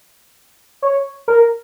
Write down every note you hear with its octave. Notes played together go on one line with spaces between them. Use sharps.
C#5
A#4